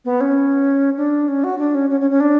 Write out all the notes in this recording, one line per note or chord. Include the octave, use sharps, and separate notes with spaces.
B3
C#4
D4
C#4
F#4
D4
C#4
C#4
C#4
C#4
D4